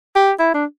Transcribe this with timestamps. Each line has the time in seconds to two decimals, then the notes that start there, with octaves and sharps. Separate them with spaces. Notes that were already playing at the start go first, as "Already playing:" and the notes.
0.15 G4
0.39 E4
0.54 D4